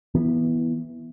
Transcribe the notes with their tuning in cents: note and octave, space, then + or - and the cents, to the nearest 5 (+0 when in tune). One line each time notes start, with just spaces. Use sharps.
E3 +0 B3 -20